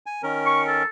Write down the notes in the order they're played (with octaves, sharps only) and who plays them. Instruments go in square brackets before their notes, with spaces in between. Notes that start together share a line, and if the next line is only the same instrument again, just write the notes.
[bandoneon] G#5
D#3 C#4 A#4
[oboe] C#6
A4